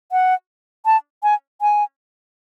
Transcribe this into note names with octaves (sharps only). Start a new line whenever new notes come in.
F#5
A5
G#5
G#5